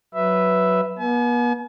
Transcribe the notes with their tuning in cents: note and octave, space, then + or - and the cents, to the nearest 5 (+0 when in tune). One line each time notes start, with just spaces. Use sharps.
F#3 +0 B4 +0 E5 +0
B3 -40 G#5 +45